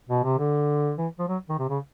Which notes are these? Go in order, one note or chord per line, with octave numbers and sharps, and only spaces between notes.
B2
C3
D3
E3
F3
F#3
D#3
C3
C#3